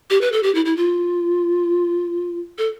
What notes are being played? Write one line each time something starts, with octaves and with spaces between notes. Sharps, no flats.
G4
B4
A4
G4
E4
E4
F4
A4